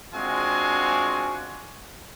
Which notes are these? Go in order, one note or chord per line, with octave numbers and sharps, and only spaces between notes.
G#3 C4 D4 F4 F#4 G#5